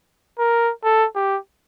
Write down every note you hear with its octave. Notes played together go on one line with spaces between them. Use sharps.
A#4
A4
G4